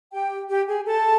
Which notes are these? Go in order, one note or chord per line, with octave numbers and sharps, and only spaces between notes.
G4 G5
G4 G5
G#4 G#5
A4 A5